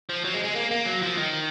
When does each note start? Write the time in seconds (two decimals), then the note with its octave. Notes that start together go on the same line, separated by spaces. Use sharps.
0.09 F3
0.25 F#3
0.34 G#3
0.44 G#3
0.56 A#3
0.71 A#3
0.85 F#3
1.02 F3
1.17 D#3